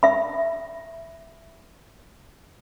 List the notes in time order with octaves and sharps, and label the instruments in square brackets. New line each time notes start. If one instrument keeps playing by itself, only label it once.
[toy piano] E5 B5